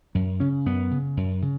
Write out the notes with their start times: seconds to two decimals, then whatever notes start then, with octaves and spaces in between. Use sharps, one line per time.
0.15 F#2 F#3
0.40 C#3 C#4
0.66 F#2 B3
0.91 C#3
1.17 F#2
1.42 C#3